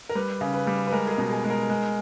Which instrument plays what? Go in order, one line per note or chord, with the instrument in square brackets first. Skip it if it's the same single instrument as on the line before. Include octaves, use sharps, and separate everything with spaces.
[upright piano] A#4
G3 B4
C#3
B4
G3
B4
G#3 A#4
G#4
A#4
B2
G#4
G#3
A#4
G#3